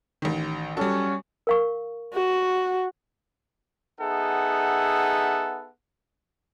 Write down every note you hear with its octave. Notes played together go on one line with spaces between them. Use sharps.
A1 D#3
F#3 G3 C#4 F#4 A4
A#4 F5 C#6
F#4
B3 D#4 G#4 A4 E5 F#5